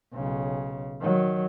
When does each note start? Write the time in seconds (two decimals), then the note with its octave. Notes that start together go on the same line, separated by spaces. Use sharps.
0.13 B1 C#3
1.02 D#3 F#3